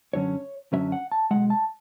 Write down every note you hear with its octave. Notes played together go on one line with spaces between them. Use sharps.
F#2 D3 F#3 C#4 C#5
F#2 D3 F#3 C#4 E5
F#5
A5
B1 A2 G#3 F#5
A5